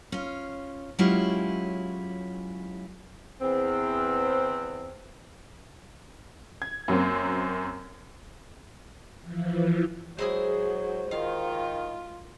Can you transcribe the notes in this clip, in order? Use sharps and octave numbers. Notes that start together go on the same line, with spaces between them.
C#4 F4
F#3 G#3 C#4 E4 F4 G4
E2 C4
G#6
F#2 F#3 A#3 C4
E3 F3
F#3 G#3 E4 G#4 C5
D#3 F4 F5